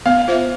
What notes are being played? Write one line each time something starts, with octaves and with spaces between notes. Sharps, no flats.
B3 F5
F4 C5 E5